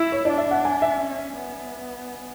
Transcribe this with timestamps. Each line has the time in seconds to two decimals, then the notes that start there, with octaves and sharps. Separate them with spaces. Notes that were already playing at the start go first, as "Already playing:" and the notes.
Already playing: E4 E6
0.12 C#5
0.25 D4 D5
0.38 E5
0.51 F#5
0.65 G#5
0.82 E5
1.00 C#4
1.36 B3